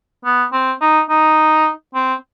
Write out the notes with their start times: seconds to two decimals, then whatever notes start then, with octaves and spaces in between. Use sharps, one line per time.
0.25 B3
0.53 C4
0.81 D#4
1.10 D#4
1.95 C4